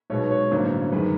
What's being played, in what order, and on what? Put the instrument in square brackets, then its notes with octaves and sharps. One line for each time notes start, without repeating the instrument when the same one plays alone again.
[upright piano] B1 B2 G#3 B3 C#5
C#5
A1 G2 D3 F#3 A#3 C5
F#2 D#3 G#3 B4